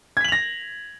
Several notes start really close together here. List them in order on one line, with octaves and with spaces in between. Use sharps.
G#6 B6 F#7 F7 A#6